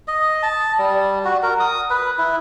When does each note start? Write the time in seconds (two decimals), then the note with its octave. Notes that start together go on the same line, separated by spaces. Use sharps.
0.08 D#5
0.43 A5
0.79 G3
1.25 F#4
1.43 A#4
1.60 D#6
1.90 B4
2.18 E4